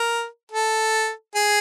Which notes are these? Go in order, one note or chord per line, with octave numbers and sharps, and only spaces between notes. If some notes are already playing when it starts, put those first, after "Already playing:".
Already playing: A#4
A4
G#4